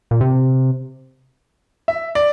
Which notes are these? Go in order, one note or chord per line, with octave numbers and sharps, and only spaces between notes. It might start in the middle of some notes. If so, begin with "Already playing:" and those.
A#2
C3
E5
D5